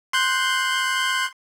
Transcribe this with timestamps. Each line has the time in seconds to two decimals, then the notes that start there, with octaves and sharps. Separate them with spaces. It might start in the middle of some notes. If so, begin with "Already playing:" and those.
0.13 C6 F#6 G6